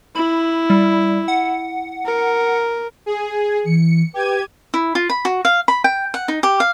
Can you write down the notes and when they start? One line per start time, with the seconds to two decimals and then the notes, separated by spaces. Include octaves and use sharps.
0.15 E4 B5
0.70 G3
1.28 F#5
2.05 A#4
3.06 G#4
3.65 E3 C#7
4.14 G4 B4 G#6 D#7
4.74 E4
4.95 F4
5.10 B5
5.25 F#4
5.45 F5
5.68 B5
5.84 G5
6.14 F#5
6.28 D#4
6.43 G4
6.60 F5